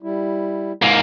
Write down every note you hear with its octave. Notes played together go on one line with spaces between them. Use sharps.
G3 E4
G#2 A#3